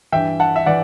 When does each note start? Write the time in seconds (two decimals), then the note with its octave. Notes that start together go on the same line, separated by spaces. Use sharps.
0.12 G2 E3 E5 G5
0.40 F#5 A5
0.56 E5
0.66 E3 D5 F#5